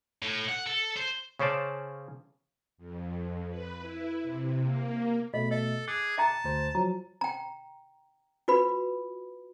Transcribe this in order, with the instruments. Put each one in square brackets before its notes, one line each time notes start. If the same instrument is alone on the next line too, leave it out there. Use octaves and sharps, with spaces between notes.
[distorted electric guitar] A2
F#5
A4
C5
[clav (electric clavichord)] C#3 C#4 C5 D5 A5
[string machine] F2
B4
E4
C3
A#3
[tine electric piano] B2 A3 [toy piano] D#5 [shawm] B5
[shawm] A4 [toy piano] D#5
[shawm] G#4 [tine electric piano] D6 F#6 A6
[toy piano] E5 G5 A#5 [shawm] A5
[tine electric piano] D2 C5
[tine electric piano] F3 F#3 [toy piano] A#5
[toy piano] G5 A#5
F4 F#4 B4 B5